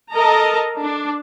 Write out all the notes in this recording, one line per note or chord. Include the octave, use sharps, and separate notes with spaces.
A4 A#4 D#5 A5 A#5
D4